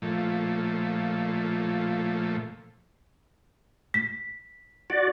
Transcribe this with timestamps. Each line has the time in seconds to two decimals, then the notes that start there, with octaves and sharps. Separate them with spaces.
0.02 A#2 F3 A3
3.94 B6
4.90 F#4 D5